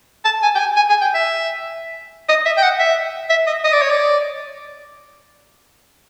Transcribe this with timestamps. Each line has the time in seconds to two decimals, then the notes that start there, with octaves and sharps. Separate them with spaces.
0.25 A5
0.43 G#5
0.55 G5
0.59 G#5
0.77 G#5
0.89 G#5
1.01 G5
1.14 E5
2.29 D#5
2.46 E5
2.57 G5
2.63 F#5
2.79 E5
3.30 E5
3.47 D#5
3.64 D#5
3.73 D5
3.82 C#5
3.90 D5